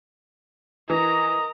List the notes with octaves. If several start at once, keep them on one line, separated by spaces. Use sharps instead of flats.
E3 A#4 D#5 A#5